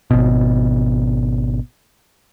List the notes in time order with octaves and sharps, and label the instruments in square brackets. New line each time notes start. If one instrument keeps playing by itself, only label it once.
[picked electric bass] G#1 B2